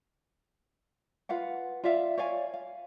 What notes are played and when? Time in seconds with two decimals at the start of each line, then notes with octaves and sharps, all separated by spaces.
1.29 F4 B4 F5 F#5
1.84 F4 D5 E5 F5
2.18 C#5 D5 F5 G#5
2.54 F5